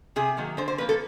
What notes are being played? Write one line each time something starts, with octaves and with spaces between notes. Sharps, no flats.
C3 G#4
D#3 F#3 A#3
D3 C5
C5
F3 A#3 B4
A4